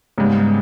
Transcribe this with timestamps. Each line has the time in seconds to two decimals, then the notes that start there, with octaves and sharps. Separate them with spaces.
0.18 G#2 C#3 G3 B3